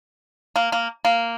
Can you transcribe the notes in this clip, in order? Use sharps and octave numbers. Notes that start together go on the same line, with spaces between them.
A#3
A#3
A#3